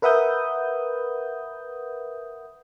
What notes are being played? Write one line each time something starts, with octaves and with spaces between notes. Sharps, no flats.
A#4 B4 E5 F#5 D#6 G6